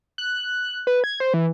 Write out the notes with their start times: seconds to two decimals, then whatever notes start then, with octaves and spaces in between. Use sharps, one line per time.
0.18 F#6
0.87 B4
1.04 G#6
1.20 C5
1.34 E3